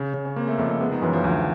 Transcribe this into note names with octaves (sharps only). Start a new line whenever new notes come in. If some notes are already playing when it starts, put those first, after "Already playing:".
Already playing: C#3
C#3
C#4
A#3 C4
A3
F2 A3
A3
G#3 B3
D#3
F#2 E3
F3
D2 E3